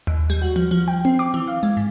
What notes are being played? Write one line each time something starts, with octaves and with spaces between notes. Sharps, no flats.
D#2
G3
F#4
F3
F3
G5
C4
D6
E3
F5
G#3
G#2